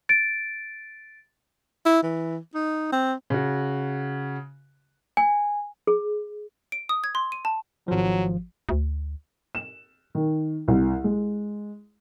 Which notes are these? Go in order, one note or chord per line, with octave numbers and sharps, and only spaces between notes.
A6 D7
E4
E3
D#4
C4
C#3 F#4
G#5
G#4
D7
D#6
G#6
C6
D#7
A5
G#1 F3 F#3
D2
E7
D#3
C2
G#3